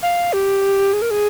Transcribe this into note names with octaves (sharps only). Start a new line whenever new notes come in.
F5
G4
G#4
A#4
G#4